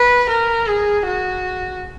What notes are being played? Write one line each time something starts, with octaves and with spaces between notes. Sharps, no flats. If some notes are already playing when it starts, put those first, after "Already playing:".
Already playing: B4
A#4
G#4
F#4